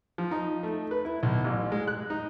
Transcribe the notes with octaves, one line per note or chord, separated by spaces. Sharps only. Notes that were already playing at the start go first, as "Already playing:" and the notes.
F3
D#4
A3
B4
E4
B1
A1
G#3
F#6
D#4